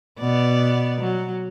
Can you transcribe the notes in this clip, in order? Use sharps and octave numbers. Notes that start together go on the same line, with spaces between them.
B2 B3 D5
F#3